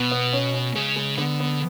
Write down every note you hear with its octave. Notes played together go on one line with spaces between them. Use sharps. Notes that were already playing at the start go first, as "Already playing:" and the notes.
Already playing: B2 B3 B4
B3
C#4
C#4
C#3 G#3
G#3
D3 B3
B3